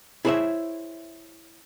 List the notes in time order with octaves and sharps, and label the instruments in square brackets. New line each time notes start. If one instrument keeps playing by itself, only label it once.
[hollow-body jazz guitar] E4 G#4 A4 C5 C#5 E5